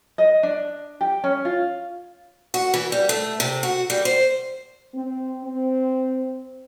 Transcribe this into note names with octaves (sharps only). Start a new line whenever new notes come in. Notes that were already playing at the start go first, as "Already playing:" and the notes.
D#5
D4
G4
C#4
F4
F#4
E3
G3
A3
C3
F#4
G3
C5
C4
C4